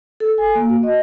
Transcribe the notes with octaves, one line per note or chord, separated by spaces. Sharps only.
A4
G#5
A#3
F#4
D#5